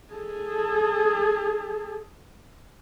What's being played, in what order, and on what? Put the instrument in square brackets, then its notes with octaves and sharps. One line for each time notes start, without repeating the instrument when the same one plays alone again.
[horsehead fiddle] G#4 A4